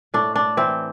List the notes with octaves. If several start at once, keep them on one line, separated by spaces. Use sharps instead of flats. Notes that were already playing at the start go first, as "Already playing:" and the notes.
A2 D4
D4
E3 C4